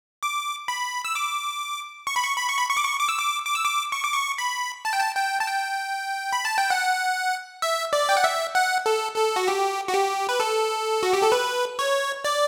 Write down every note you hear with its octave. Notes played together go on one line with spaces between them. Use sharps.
D6
B5
E6
D6
C#6
B5
C#6
B5
C#6
B5
C#6
D6
C#6
D6
E6
D6
D6
E6
D6
C#6
D6
C#6
B5
A5
G5
A5
G5
A5
G5
B5
A5
G5
F#5
E5
D5
G5
F#5
E5
F#5
A4
A4
F#4
G4
F#4
G4
B4
A4
F#4
G4
A4
B4
C#5
D5